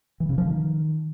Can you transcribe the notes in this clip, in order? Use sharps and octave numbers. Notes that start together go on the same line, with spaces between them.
E3
C#3
F3
D#3